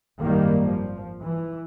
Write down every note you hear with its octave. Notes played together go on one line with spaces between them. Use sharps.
G#1 F#2 D#3 G3 A#3
F3
E3